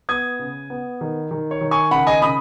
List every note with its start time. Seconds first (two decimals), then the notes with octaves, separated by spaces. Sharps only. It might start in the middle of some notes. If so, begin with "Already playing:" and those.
0.09 B3 D#6 G#6
0.39 C#3
0.70 B3
1.01 D#3
1.31 D#3
1.51 C#5
1.61 D#3
1.71 G#5 C#6
1.91 C#3 F#5 B5
2.07 D#5 G#5
2.22 C#3 B5 D#6